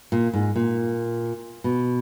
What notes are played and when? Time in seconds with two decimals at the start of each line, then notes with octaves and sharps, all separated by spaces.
0.12 A#2
0.33 G#2
0.56 A#2
1.64 B2